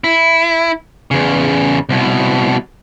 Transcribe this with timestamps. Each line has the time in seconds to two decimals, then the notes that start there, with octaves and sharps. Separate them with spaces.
0.04 E4
1.11 E2 C#3
1.89 C2 B2